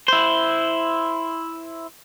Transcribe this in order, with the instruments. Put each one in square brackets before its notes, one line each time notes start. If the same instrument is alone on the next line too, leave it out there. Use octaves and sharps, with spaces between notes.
[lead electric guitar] E4 C5